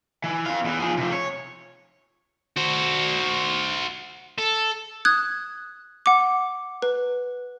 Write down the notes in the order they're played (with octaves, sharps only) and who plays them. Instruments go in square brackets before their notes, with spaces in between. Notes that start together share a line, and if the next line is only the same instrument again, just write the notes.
[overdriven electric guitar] E3
C4 F5
E2 E3
F3 G#4
C3 F3
C#5
[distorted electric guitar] F#4 C5
A4
[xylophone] D#6 F#6 G#6
F#5 D6
B4